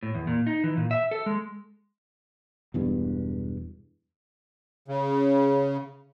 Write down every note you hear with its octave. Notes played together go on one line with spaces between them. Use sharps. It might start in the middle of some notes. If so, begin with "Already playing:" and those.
A2
E2
A#2
D#4
E3
A#2
E5
A4
G#3
E1 E2 G2
C#3